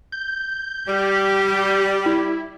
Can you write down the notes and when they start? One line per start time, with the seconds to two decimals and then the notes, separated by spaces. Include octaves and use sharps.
0.12 G6
0.88 G3 G4
2.06 E4